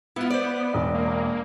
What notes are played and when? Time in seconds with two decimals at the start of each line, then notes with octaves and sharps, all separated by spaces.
0.16 B3 E4 F4
0.30 C5 D5
0.74 E1
0.94 A#3